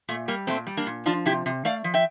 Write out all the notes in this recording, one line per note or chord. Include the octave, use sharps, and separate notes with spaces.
A#2 A3
G3 A#3
A#2 A3 C4
G3
A#3 D4
A#2
F3 D4 F4
C3 E4 G4
C3
A3 D5 F5
F3
E5 G5